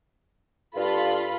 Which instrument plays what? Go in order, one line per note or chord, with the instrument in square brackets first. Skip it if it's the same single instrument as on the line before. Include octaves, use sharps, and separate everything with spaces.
[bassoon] G2 [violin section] F4 A4 B5